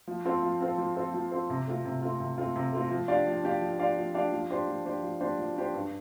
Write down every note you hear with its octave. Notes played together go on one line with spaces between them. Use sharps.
F3
C4 F4 A4 C5
F3
C4 F4 A4 C5
F3
C4 F4 A4 C5
F3
C4 F4 A4 C5
C3
A3 C4 F4
C3
A3 C4 F4
C3
A3 C4 F4
C3
A3 C4 F4
F3
D4 G4 D5 F5
F3
D4 G4 D5 F5
F3
D4 G4 D5 F5
F3
D4 G4 D5 F5
F3
D4 G4 C5
F3
D4 G4 C5
F3
D4 G4 C5
F3
D4 G4 C5
G2